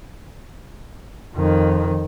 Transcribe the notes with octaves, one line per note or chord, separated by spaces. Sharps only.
F2 D#3